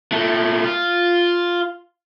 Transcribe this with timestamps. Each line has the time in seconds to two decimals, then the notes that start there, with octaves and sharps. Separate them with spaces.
0.12 A#2 A3
0.64 F4